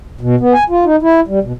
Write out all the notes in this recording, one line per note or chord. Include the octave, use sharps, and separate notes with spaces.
B2
B3
G#5
F4
D#4
E4
G3
B2